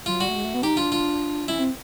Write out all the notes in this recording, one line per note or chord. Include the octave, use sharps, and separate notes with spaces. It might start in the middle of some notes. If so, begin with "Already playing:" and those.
F#3 F4
G3 F#4
A3
G#3
A3
B3
D#4 G4
D4 F4
F4
C#4 E4
C4